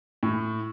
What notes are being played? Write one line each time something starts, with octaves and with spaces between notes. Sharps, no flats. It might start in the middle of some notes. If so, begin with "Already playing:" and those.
A2